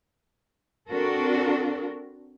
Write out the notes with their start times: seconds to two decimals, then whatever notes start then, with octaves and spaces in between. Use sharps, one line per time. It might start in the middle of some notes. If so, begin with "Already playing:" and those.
0.89 C4 D4 F#4 A4 A#4